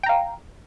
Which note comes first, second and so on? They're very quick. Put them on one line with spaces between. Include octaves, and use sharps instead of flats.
G5 A#5 F5